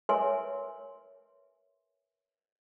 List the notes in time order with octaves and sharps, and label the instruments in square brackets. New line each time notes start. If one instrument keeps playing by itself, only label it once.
[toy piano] A#4 B4 C#5 E5 G#5 C6